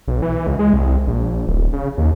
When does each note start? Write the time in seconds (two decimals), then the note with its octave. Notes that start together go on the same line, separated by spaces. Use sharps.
0.08 B1
0.22 E3
0.47 C#2
0.59 G#3
0.73 C2
1.07 A#1
1.47 D1
1.73 C#3
1.98 D#2